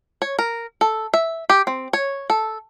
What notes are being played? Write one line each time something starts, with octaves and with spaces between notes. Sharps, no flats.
C#5
A#4
A4
E5
G4
C4
C#5
A4